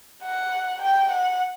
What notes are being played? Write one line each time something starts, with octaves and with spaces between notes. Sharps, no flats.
F#5
G5
F#5